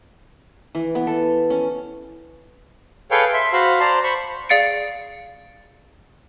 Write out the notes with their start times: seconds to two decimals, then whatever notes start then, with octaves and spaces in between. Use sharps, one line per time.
0.75 E3
0.95 B3
1.07 A4
1.50 C#4
3.11 G#4 A4 B4 C#5 F5 G5
3.33 E5 C6
3.53 F#4 C5 F5 B5
3.80 C5 D5 A5 A#5 C6
4.04 C5 B5 C#6
4.49 G#4 D5 F5 A6 C#7 D7